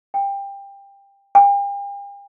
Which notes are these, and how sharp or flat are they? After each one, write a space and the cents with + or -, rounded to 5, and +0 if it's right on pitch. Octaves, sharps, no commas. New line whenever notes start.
G5 +20
G5 +40